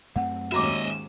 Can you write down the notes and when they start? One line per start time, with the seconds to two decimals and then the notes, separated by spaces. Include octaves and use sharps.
0.16 F#2 A3 C4 F#5
0.52 D#2 G#2 C#4 F#4 D#5 E5 A#5 D6